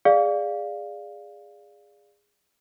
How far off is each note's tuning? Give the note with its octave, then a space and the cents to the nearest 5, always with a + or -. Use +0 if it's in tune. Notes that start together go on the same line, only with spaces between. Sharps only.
G#4 -15 D5 +0 F5 +0